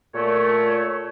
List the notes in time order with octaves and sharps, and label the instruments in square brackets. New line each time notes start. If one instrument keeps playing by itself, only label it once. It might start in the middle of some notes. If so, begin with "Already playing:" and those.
[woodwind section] A#2 A3 C#5